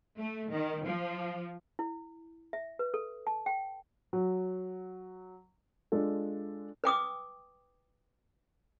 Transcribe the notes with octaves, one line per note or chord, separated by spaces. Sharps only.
A3
D#3
F3
E4
E5
B4
A4
A5
G5
F#3
G#3 D4 F4 A4
B4 G5 D6 D#6